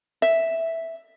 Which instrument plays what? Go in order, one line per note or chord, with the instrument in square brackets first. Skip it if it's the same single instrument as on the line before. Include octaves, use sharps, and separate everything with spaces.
[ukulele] E5